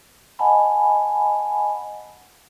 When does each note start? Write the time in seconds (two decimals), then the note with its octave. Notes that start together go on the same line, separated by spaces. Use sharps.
0.39 D#5 F#5 G#5 A5 B5